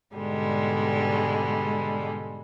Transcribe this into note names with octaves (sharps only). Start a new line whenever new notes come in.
G#2 B2 D3 G3 G#3